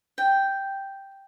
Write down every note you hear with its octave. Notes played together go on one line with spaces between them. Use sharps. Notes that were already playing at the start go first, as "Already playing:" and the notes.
G5